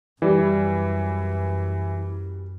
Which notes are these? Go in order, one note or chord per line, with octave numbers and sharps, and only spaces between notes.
F#2 E3 G3